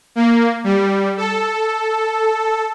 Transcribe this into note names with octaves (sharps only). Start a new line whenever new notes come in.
A#3
G3
A4